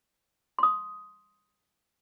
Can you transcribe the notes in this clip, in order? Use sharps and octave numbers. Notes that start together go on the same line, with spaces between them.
C6 D#6